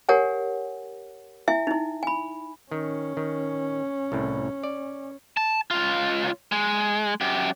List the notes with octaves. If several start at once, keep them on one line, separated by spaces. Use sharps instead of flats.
G4 A#4 C#5 F#5 G#5
E4 E5 G#5
D#4 E4
G#5 B5
D#3 C#4
D#3
C2 A2
D5
A5
C#2 F4
G#3
F#2 G4